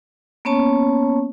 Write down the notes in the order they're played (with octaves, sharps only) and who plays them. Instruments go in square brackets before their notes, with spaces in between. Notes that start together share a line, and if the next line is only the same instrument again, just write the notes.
[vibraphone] A#3 B3 C#4 C#5 A5 C#6